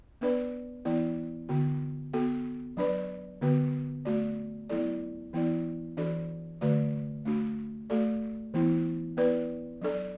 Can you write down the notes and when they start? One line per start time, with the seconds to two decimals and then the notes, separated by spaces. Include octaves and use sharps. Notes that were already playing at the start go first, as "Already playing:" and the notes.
0.21 B3 D4 B4 D5
0.85 E3 B3 E4 D5
1.49 D3 B3 F#4
2.13 B3 F#4 A4
2.77 F#3 D4 B4 D5
3.41 D3 B3 F#4 B4
4.05 A3 F#4 D5
4.70 F#3 B3 E4 A4 D5
5.33 E3 B3 E4 D5
5.97 E3 D4 F#4 A4 D5
6.61 D3 A3 F#4 B4 D5
7.25 A3 D4 F#4
7.90 A3 F#4 A4 D5
8.54 E3 B3 E4
9.17 B3 E4 B4 D5
9.81 F#3 D4 A4 D5